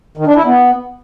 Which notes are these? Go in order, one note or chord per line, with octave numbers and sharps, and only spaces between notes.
D#3
D4
E4
B3